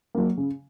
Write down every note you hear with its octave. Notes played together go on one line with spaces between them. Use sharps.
F#3 A#3
C#3